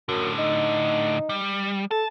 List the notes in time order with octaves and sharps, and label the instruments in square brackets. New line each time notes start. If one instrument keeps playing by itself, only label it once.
[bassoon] F#2 [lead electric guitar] A2 D3
[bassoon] D#4
[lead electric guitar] G3
[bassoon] A4 [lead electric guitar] A5